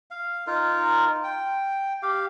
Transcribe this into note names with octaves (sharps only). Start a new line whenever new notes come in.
F5
D#4 F4 A#4
G5
G4 F5